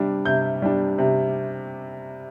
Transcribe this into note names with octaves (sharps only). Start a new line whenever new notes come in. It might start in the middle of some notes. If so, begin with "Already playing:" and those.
Already playing: C3 G3 D4
C3 G6
G3 D4
C3